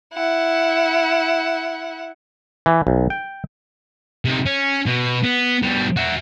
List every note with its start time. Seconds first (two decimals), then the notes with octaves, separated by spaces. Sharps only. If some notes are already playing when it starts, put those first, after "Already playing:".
0.14 E4 F#5
2.66 E3
2.87 B1
3.10 G5
4.25 C3 D#4
4.46 C#4
4.86 B2
5.23 B3
5.62 B2 G3
5.96 F#4 E5